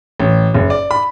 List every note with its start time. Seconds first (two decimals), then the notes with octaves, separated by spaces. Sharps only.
0.20 A1
0.54 F#1
0.70 D5
0.91 B5